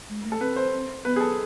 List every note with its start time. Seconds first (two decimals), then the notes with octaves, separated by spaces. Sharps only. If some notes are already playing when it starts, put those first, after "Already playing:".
0.09 G#3
0.25 A3
0.32 A4
0.41 C4 B4
0.56 C5
0.73 C4
1.05 B3 B4
1.16 G#4
1.21 A4